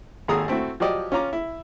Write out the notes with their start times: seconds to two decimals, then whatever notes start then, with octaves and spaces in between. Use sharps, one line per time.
0.28 G#1 D#2 G#4 A4 A#5 D#6
0.48 A3 C4 E4 F#4
0.80 F3 F#3 G4 D5 D#5
1.12 C#4 F4 A#5 D6
1.33 E4